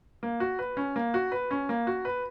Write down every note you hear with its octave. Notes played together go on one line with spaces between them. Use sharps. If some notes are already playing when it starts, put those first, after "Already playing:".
A#3
F#4
B4
C#4
A#3
F#4
B4
C#4
A#3
F#4
B4